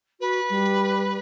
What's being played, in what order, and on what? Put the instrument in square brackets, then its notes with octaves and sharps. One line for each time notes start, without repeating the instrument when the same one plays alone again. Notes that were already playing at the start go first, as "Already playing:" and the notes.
[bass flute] F#4 [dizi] B4
[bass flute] G3